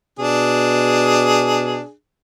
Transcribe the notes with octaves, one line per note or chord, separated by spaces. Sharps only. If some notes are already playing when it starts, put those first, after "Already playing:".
B2 D4 G#4